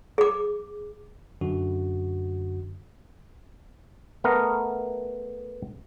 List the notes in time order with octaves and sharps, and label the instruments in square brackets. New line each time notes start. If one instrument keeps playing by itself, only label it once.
[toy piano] G#4 D6
[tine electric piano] F#2 D3 F#4
[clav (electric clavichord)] A3 B3 A#4 F5